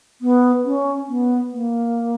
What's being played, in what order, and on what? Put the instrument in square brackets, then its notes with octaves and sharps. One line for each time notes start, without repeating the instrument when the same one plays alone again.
[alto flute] B3
C#4
B3
A#3